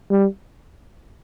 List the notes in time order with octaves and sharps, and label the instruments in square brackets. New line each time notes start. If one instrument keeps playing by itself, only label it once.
[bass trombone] G3